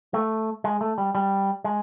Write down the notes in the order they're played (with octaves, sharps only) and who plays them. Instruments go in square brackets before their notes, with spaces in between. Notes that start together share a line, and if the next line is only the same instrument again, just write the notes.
[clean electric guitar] A3
G#3
A3
G3
G3
G#3